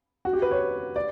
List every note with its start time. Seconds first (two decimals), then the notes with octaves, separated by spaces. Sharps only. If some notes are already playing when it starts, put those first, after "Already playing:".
0.25 F#4
0.33 G4
0.42 B4
0.51 C#5
0.96 D5